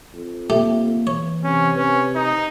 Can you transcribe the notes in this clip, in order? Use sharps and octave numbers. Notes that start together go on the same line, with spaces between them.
F2
A3 A#3 G4
E3 C#5
C3 C#4
C#4 B4
D#4 D#6